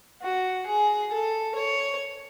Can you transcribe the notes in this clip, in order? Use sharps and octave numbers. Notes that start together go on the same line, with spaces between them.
F#4
G#4
A4
C#5